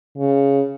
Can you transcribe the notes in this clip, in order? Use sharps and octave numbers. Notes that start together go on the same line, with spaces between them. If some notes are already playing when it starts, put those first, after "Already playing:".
C#3